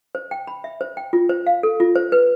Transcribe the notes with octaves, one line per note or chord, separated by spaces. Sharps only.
C5
G5
B5
E5
C5
G5
F4
C5
F5
A4
F4
C5
B4